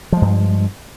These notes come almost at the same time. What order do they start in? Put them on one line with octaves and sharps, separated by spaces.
F3 G#3 G2